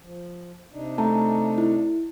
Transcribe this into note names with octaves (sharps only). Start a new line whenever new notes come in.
F3
C3 D4 D#4
A3 A5 A#5
E4